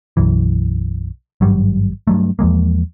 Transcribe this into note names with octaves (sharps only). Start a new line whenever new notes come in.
B1 F#2 E3
G#1 G2 F#3 G3
G2 F#3 A3
E2 F3 G#3 A#3